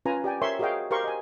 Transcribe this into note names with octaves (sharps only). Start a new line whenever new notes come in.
C#4 F4 B4 G#5 A#5
G4 D5 G5 G#5
A#4 C5 C#5 E5 C6 C#6
F#4 G#4 A#4 D#5 F5 G5
G4 A#4 C5 F5 C6 C#6
D#5 G#5